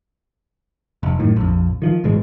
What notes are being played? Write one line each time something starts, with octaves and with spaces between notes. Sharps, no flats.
F1
F#2 A2 D#3
A#1 F2
D#3 F3
G#1 B2 E3 G#3